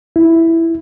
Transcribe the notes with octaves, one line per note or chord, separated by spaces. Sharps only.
E4